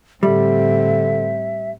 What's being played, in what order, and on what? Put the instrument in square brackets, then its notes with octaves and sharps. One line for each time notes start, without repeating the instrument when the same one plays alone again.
[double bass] A2 C4 [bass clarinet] D3 [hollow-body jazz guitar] G3 [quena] E5